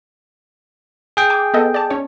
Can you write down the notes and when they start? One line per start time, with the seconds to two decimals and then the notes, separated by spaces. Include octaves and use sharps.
1.17 G#4 G5
1.30 G#5 D6
1.54 B3 A4 D#5
1.74 D5 A5
1.90 C#4 C#5